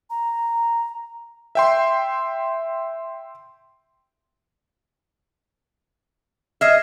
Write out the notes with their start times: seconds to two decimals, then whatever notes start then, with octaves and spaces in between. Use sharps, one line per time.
0.10 A#5
1.55 E5 G5 C6
6.61 D#5 E5 F6 G#6 C7